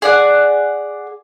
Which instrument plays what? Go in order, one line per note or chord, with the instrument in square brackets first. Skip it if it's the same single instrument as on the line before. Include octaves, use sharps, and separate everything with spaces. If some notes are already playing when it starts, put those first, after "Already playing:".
[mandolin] G#4 D5 F#5